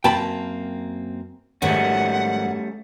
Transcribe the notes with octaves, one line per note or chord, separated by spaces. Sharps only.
F#2 A#3 C4 G5 A5 B5
G#2 D#3 F3 G3 A3 C#4 F#5